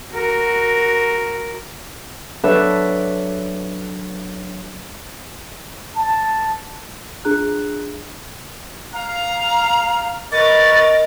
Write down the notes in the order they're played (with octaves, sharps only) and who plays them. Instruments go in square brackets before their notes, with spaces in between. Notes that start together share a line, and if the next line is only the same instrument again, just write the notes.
[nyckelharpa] F#4 A#4
[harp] F#3 D4 A4 B4 E5
[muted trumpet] A5
[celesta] D4 F4 G#4 A#5 F#6
[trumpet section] F5 [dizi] A#5
[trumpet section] G3 B4 C#6 [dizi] A#4 [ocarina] D#5 [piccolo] A6